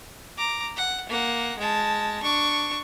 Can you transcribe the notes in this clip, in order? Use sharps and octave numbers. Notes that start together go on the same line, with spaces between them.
A#5 D6
F#5
A#3 F#5
G#3 A5
D4 C#6